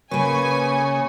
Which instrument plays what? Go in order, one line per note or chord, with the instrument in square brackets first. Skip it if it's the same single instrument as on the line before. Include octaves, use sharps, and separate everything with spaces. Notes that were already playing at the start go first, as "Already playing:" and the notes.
[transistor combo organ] C#3 C#5 [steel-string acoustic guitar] A#3 B4 [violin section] G#5